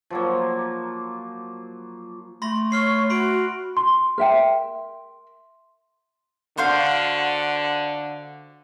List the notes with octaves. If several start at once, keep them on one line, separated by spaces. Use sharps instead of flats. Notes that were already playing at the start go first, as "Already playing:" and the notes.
F3 F#3 A#3
A3 B5 C6 A#6
C#5 C#6 F6 C7
F#4 B5 C6 D7
C6
A#4 E5 G5
D3 F#4 C5 F5